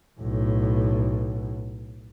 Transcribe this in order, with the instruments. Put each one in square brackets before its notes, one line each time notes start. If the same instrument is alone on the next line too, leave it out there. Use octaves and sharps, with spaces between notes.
[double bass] B1 A2